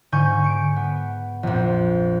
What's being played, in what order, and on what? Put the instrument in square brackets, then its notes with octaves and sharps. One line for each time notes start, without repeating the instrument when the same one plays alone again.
[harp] G#2 D3 G#5 C#6 G6
C#7 D7
B3
A#1 F2